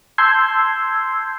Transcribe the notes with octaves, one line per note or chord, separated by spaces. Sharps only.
A5 C6 E6 G6 G#6 C7